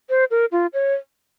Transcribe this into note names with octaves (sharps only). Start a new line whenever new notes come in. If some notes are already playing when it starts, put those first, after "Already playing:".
C5
A#4
F4
C#5